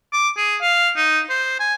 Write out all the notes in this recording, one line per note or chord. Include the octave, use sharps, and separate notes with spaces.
D6
G#4
F5
D#4
C5
G#5